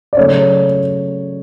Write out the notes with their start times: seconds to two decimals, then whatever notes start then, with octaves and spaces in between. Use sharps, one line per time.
0.13 D5
0.17 C#3 F#3 A3 C#5